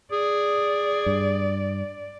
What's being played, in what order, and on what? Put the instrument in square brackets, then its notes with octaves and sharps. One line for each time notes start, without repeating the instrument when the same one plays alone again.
[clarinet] G#4 [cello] D5
[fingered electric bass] G2